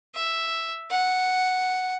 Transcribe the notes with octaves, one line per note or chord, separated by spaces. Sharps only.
E5
F#5